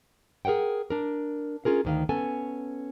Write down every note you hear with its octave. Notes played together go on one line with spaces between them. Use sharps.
G#4 A#4 C5 F#5 G5
D4 A#4
C#4 F4 G#4 A#4
D2 D#3 F5
B3 C#4 A4 G#5